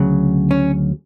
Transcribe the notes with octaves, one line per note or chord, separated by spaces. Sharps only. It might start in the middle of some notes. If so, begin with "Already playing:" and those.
Already playing: D2 C#3 F#3
C#4